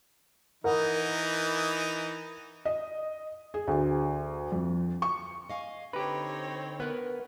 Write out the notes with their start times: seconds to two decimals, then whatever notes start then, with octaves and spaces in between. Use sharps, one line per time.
0.64 E3 D#4 A#4 F#5
2.65 D#5
3.54 G#4
3.67 D2
4.52 F2
5.02 C#6
5.49 D#5 F5 G#5
5.93 D3 C4 D#4 G4 B4 C#5 A#5 B5
6.80 B3 A#4 B4 F#5